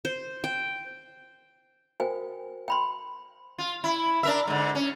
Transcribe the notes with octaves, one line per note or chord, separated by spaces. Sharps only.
C5
G5
F#4 A#4 C5 G5 G#5
G5 B5 C6
F4
E4
D4 A#4 E5
G#2 D3
C#4